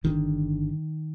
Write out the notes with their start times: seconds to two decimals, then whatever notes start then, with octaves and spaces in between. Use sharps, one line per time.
0.04 G1 G2 D3 D#3